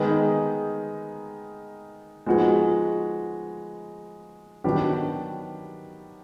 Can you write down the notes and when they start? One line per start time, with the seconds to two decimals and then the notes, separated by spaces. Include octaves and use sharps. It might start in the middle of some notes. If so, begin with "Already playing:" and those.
Already playing: D#3 G#3 B3 D#4
2.26 F3 G#3 B3 D#4 F#4
4.64 D#3 F#3 B3 D4 G4